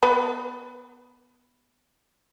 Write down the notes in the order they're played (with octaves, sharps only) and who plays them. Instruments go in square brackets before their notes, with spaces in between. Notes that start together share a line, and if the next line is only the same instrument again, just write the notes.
[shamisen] B3 B4